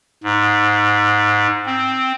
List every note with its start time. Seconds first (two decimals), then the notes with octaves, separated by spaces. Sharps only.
0.24 G#2
1.66 C4